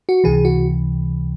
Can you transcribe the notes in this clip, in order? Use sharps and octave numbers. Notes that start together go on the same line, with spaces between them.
F#4
C#2 C3 E3 G#4
F#4